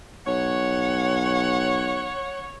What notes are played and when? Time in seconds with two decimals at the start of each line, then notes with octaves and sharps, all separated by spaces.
0.27 B1 C#5 F#5